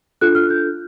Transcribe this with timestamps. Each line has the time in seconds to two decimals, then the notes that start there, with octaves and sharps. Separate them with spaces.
0.21 D4 F4 A4 F#6
0.35 F6
0.50 G6